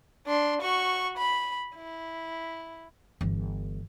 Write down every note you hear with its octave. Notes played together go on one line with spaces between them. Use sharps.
D4 C6
F#4 C#6
B5
E4
G1 E3